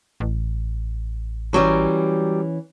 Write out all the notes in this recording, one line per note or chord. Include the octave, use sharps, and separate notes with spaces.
A1
E3 F#3 G3 C#4